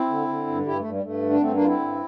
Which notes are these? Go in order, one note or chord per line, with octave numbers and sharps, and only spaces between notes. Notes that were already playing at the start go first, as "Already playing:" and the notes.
Already playing: C4 E4
D3
D3
G2
G2 E4 G4
A3
G2
G3
G2 A3
D3
D4
G2 A3 C4
A#3 D4
D3 F4
C4 E4
G2